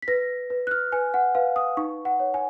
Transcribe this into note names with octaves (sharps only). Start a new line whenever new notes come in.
B6
B4 A#6
B4
F#6
F6
B4 G#5
F#5
B4 F5
D#6
D#4 C#6
F#5
C#5
G#5